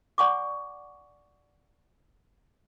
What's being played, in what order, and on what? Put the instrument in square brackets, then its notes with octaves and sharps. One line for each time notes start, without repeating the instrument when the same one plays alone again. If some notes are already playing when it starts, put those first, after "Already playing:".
[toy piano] D5 F#5 G#5 C#6 D6